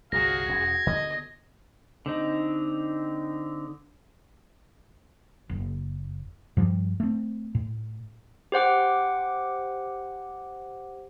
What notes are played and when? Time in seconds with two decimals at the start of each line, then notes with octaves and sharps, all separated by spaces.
0.12 G1 C2 F#4 G#4 F5 A#6
0.48 E1 C#4 G#6
0.87 D3 B3 D#5
2.06 D3 C4 D#4
5.49 F#1
6.57 G2 F3 G3
7.00 A3 C4
7.55 A2
8.52 G4 C5 F#5 D6